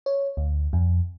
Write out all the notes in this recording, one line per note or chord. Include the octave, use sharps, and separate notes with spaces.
C#5
D2
F2